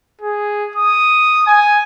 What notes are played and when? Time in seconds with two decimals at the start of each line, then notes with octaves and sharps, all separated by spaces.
0.21 G#4
0.76 D#6
1.47 G#5